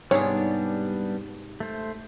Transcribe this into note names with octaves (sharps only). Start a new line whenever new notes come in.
G#2 C3 G3 B3 D4 G#4 C#5
A3 C5